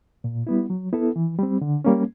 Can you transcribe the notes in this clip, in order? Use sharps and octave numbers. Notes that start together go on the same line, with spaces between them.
A#2
G3 B3 E4
F#3
B3 E4 A4
E3
G3 C4
D3
G3 A#3 C#4